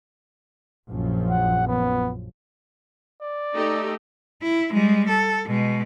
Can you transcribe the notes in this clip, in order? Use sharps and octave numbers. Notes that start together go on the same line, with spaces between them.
A#1 F#2 F3
F#5
B3
D5
A3 D#4 G4
E4
G3 G#3
A4
B2 G#3